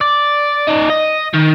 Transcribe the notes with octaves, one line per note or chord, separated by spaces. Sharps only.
D5
D#4 D5
D#5
D#3